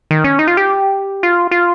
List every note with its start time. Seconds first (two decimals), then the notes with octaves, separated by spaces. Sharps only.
0.11 D#3
0.24 C#4
0.39 D#4
0.48 F4
0.57 G4
1.23 F4
1.51 F4